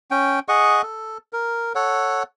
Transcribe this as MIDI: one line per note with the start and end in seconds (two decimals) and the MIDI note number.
0.11 0.40 61
0.11 0.40 79
0.49 0.82 68
0.49 0.82 75
0.49 0.82 78
0.49 0.82 85
0.83 1.18 69
1.33 1.73 70
1.75 2.23 69
1.75 2.23 73
1.75 2.23 78